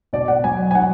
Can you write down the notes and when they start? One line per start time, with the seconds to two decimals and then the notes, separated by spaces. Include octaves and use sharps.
0.13 B2 D5
0.28 F#5
0.44 F#3 G#5
0.71 G#5
0.75 F#3 F#5